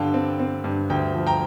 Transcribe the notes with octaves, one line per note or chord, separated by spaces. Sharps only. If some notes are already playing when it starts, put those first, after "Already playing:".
Already playing: G2 D3 G3 F5 G5 A5
C4
C4
G2
D2 G5
F3
G5 A#5